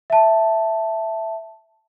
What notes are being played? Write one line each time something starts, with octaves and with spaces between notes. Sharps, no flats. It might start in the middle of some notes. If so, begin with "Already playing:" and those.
E5 A5